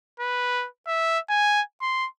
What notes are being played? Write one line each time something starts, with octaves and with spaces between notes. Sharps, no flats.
B4
E5
G#5
C6